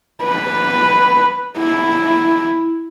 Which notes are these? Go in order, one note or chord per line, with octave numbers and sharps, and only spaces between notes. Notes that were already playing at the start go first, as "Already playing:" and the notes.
B4
E4